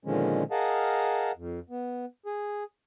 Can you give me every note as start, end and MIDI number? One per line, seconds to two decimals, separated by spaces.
0.05 0.43 46
0.05 0.43 50
0.05 0.43 51
0.05 0.43 53
0.05 0.43 56
0.05 0.43 61
0.51 1.31 68
0.51 1.31 70
0.51 1.31 75
0.51 1.31 77
0.51 1.31 78
0.51 1.31 81
1.36 1.60 41
1.70 2.05 59
2.26 2.63 68